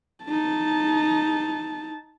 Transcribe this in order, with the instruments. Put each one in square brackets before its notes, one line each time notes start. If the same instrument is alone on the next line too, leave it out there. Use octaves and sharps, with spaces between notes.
[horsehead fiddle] D#4 A5